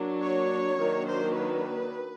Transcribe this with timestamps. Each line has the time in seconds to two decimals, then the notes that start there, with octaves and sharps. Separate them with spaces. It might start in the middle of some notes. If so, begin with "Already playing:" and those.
Already playing: F#3 A#3 D4
0.21 C#5
0.77 D#3 F#3 A#3 D4
1.06 C5
1.34 B4